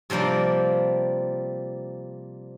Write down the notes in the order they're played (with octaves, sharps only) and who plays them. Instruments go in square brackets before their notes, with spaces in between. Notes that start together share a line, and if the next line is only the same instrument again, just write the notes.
[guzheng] C3 F3 G3 A#3 D5